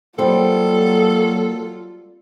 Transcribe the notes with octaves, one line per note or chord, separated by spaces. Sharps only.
F#3 G3 A#3 C4 F4 A4